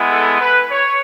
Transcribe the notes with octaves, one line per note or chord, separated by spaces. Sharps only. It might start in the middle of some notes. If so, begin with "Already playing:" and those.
Already playing: G#3 B3 E4
A4
B4
C#5